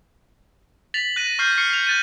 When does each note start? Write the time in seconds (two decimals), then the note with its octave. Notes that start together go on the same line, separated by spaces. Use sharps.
0.94 A6 B6 F7 F#7
1.16 F#6 A#6 D#7
1.39 C#6 F6 G6 C7
1.58 C#6 F6 C7 C#7
1.70 C7 F7
1.87 F#6 A6 D#7